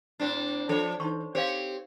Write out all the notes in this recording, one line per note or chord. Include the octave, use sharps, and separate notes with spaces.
A2 C4 D4
F3 D4 A4 C#5
E3 D#4 C6 C#6
C4 G4 C5 C#5 F5